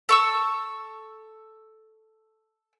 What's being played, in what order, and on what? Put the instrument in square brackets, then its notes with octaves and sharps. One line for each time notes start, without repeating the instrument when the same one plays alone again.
[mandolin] A4 C#6 E6